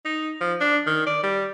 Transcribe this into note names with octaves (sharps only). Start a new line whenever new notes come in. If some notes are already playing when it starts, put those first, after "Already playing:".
D#4
F3
D4
D#3
D5
G3